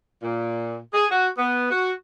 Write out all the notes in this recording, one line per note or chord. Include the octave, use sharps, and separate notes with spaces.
A#2
G#4
F#4
B3
F#4